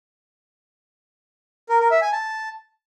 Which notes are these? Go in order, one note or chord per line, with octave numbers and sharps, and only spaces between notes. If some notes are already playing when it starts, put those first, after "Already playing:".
A#4
A#4
E5
G#5
A5